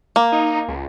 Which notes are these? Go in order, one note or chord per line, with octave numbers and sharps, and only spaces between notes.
A#3
D#4
C#2